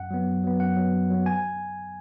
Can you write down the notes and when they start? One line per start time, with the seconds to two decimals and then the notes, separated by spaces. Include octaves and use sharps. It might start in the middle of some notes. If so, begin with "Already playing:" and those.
Already playing: F#2 F#5
0.11 F#3 B3
0.27 F#2
0.44 F#3 B3
0.60 F#2 F#5
0.77 F#3 B3
0.93 F#2
1.10 F#3 B3
1.26 G#5